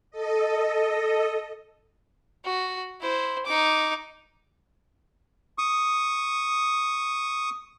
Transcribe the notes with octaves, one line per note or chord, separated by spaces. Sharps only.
A4 D#5
F#4
E4 C5
D#4 D6
C#6 D#6